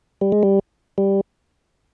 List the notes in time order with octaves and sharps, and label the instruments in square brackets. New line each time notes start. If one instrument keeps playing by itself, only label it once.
[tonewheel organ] G3
G#3
G3
G3